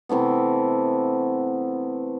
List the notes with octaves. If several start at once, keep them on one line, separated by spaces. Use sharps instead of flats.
C3 E3 A3 B3